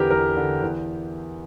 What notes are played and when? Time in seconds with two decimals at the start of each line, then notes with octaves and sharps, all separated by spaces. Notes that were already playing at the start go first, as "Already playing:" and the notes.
Already playing: E2 D3 G4 A#4 B4
0.11 E2 A#4
0.36 D3
0.62 E2